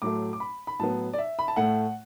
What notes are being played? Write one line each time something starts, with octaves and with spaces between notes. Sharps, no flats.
A2 F#3 A3 D6
D6
B5
B5
A2 F#3 B3 A5
D5
E5
B5
A5
A2 A3 F#5